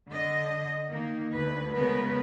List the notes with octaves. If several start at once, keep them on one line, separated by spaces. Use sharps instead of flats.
D3 D#5
D#3 A#3 D#4
D2 B4
C#3 F3 G#3 B3 A#4 B4